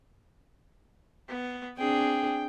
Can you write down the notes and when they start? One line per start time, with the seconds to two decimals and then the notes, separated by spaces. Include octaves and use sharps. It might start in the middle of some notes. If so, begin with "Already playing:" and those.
1.29 B3
1.78 C4 D4 G#4 G5